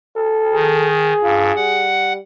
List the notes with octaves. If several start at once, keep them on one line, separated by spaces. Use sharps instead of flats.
A4
D#3 G#4
G2 F4
G3 F#5